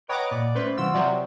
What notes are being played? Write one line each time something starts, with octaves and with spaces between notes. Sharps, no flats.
B4 C#5 D#5 F#5 G5 A#5 D6
A#2 D5
A3 C#4 B4 C5
C3 E3 G3 F4 F#4 E6
C3 F3 F#3 C5 D5